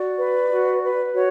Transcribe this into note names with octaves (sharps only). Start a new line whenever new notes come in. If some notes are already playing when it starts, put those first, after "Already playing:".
Already playing: F#4 D5
B4
F#4
B4
F#4 C#5